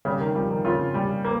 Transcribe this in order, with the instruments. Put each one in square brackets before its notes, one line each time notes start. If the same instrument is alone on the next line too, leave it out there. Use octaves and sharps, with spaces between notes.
[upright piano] C#3 [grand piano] G3
[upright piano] D#3
[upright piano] F3 [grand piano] G3
[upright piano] D#3
[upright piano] C#3 [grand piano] F4
[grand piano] G3
A#3